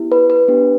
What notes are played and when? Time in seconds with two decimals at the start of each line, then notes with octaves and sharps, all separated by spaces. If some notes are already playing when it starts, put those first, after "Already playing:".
Already playing: B3 E4 G4
0.12 B4
0.30 B4
0.48 B3 D4 G4